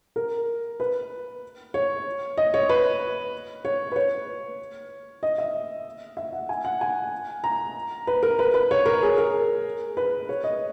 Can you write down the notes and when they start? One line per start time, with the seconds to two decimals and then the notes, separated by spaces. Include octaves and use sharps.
0.16 A#4
0.80 B4
1.74 C#5
2.38 D#5
2.54 C#5
2.69 B4
3.65 C#5
3.92 B4
3.96 C#5
5.23 D#5
5.38 E5
6.17 E5
6.33 F#5
6.49 G#5
6.65 F#5
6.81 G#5
7.44 A#5
8.07 B4
8.23 A#4
8.39 B4
8.54 B4
8.71 C#5
8.86 A#4
9.03 G#4
9.18 A#4
9.97 B4
10.29 C#5
10.44 D#5